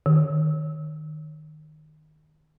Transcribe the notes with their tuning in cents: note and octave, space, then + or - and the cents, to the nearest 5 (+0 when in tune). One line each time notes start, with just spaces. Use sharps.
D#3 -20